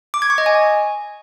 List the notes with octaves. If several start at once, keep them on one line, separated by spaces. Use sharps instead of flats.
D6
G#6
C#6
D#5
G#5